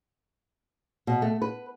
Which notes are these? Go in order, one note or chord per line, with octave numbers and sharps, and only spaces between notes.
B2
A3
B4